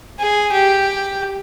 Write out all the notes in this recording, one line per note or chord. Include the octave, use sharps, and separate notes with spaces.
G#4
G4